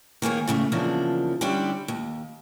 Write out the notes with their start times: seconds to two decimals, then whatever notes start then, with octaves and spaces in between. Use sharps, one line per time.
0.22 D#3 A#3 G#4 C#5
0.48 A2 C#3 A3
0.72 E2 C#3 F3 A#3 D4
1.41 D3 G3 C#4 D4 E4 G4
1.88 D#2